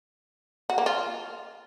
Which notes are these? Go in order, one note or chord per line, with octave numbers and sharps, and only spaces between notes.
F#4
A#3
F4